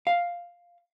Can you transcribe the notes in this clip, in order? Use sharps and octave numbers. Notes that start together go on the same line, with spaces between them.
F5